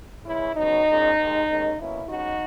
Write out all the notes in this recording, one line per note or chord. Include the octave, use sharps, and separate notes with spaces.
C#3 E3 G#3 C#4 E4
C#3 F#3 B3 D#4
A#2 G#3 C#4
D#2 D#3 G#3
D#2 D#3 G#3 C#4
B2 A#3 C#4 E4
B2 G#3 C#4 D#4 F#4